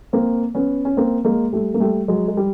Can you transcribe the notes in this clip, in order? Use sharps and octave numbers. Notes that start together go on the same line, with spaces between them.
A#3 C4
B3 C#4
C#4
A#3 C4
G#3 A#3
G3 A3
A#3
G3 A3
F#3 G#3
G#3
G3